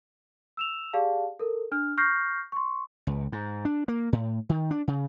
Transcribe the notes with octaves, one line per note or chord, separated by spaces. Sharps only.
E6 E7 F7
G4 G#4 D5 F5 A5
A4 A#4
D4 F6
C#6 F6 G6 A#6 C7
C6 C#6
C#2
G#2
D4
A#3
A2
D#3
D4
C#3